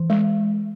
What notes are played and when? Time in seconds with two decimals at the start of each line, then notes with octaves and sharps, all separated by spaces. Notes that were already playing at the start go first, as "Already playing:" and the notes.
Already playing: E3
0.10 G#3